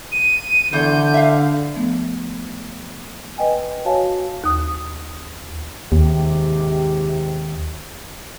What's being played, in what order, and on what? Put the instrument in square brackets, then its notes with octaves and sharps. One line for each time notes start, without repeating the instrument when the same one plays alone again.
[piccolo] D#7
[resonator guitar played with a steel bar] E2 [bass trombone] D3 [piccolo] G6
[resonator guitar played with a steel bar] E5 F5
[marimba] F3 A3 B3
B4 D#5 G5 G#5
F#4 C#5 F5 G#5 A5
D#2 D#6
[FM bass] D#2 [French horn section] G#2 C3 G4